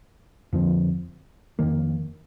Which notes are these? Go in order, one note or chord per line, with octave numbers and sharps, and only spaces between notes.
F2 D3 F3 C4
F2 D#3 A#3